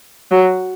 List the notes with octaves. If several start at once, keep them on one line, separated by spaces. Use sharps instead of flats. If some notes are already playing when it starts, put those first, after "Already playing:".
F#3